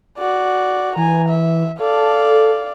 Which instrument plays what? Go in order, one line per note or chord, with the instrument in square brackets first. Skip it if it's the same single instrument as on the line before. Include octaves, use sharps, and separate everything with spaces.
[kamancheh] F#4 D5
[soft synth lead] E3 [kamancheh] G#5 A#5
[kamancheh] E5
[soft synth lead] A4 [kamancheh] D5 F5